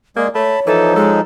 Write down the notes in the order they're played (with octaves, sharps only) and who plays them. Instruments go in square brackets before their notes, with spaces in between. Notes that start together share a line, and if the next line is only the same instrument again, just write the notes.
[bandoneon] G#3 G#4 [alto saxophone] A#3 [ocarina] D5
[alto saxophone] A3 [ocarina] C#5 [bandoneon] A5 B5
[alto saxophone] E3 [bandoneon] F3 D#4 [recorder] A4
[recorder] G#3 [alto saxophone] A4